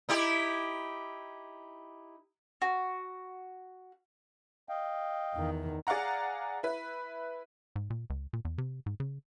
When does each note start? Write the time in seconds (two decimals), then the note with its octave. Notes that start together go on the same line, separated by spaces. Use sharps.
0.09 D#4 E4 G4
2.62 F#4
4.69 D#5 F5 G5
5.34 E2 D#3
5.87 G#4 D5 F5 F#5 A#5
6.63 E4 B4
7.76 G#2
7.90 A#2
8.10 C#2
8.33 A#2
8.45 E2
8.58 C3
8.86 G#2
9.00 C#3